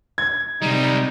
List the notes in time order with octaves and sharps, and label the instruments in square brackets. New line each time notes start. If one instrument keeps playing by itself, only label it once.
[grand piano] G#6
[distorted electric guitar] C3 G3 [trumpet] D#4